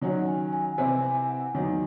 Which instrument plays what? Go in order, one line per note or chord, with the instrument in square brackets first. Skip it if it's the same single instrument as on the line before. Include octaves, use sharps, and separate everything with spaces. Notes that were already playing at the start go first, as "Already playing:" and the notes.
[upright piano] D#3 F#3 C#4 F#4
[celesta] G#5
G#5
[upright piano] C3 E3 C4 E4 [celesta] G#5
[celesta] G#5
F#5
[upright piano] E2 D#3 F#3 [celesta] G#5